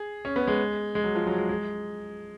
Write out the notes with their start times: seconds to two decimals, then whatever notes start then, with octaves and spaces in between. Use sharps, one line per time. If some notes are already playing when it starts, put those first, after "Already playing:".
Already playing: G#4
0.25 C#4
0.36 B3
0.47 G#3
0.95 G#3
1.04 F#3
1.15 F3
1.27 F#3
1.38 G#3
1.49 G#3